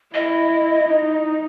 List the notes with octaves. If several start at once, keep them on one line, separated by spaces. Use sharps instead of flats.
E4 D#5
D#4